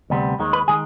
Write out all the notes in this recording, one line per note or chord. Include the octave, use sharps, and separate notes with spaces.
D2 C3 G3 B3
D#2 D#3 G#3
B4
D#3 G#3 G#4